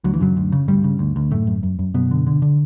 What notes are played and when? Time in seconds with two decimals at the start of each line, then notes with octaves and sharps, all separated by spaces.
0.04 D2 F#3
0.14 E3
0.21 F#2 C#3 F#3
0.37 D2
0.52 C#3
0.68 D2 G2 G3
0.84 C#3
0.99 D2
1.16 D2
1.31 F#2 A2 A3
1.47 F#2
1.63 F#2
1.79 F#2
1.94 F#2 B2 B3
2.11 D3
2.27 D3
2.42 D3